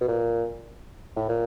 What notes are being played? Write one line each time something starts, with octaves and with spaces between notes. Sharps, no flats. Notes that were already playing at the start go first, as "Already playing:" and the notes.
B2
A#2
A2
A#2